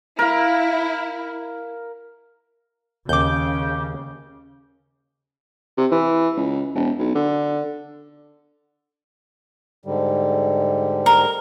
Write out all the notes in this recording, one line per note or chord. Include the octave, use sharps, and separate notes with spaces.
E4 A#4 F5
D#2 C#3 D6 G6
C3
E3
C#2
E1
B1
D3
G#2 D3 G3
A#4